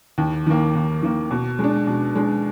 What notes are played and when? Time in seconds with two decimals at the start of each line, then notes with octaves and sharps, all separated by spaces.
0.18 D#2
0.46 D#3 A#3
0.75 D#2
1.02 D#3 A#3
1.31 B2
1.59 G#3 D4
1.87 B2
2.15 G#3 D4